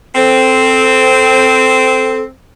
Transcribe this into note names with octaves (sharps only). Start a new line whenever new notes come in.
C4 A4